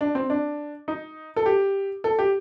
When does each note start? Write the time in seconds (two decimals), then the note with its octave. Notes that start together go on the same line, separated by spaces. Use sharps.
0.01 D4
0.15 C4
0.30 D4
0.88 D#4
1.36 A4
1.46 G4
2.04 A4
2.19 G4